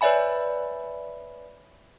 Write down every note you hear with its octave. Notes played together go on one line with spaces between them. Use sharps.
B4 C#5 D5 E5 G#5 B5